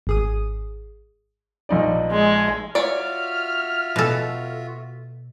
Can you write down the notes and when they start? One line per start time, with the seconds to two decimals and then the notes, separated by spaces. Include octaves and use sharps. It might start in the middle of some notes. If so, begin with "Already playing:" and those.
0.07 G#1 G#4 D#6
1.69 A#1 D#4 D5
2.11 G#3
2.75 F4 F#4 C#5 D5 E5 F6
3.96 B2 A4